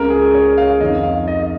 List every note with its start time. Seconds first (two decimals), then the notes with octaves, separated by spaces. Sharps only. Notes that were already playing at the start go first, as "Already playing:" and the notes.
Already playing: C#2 C#3 A#4
0.10 G#4
0.34 C#5
0.58 F5
0.81 F2 D#3 D#5
1.03 F5
1.28 D#5
1.43 D#5